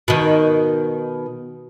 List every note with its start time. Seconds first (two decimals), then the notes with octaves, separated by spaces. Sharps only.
0.08 B2 D#3